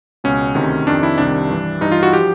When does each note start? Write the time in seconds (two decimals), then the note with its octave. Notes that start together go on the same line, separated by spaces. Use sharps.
0.24 C#2 B2 C#4
0.55 D2 C3 D#3
0.87 F2 C3 D#3 D4
1.03 E4
1.18 C2 C3 D#3 D4
1.50 G2 E3
1.81 G2 E3 D#4
1.92 F4
2.03 F#4
2.13 F3 G4